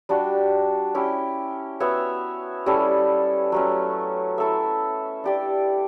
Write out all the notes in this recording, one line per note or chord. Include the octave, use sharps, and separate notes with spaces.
G3 D4 F#4
C#4 E4 G4
B3 F#4 C#5 E5
G3 C#4 E4 A4
F#3 A3 C#4
E4 A4 E5
D4 G4 D5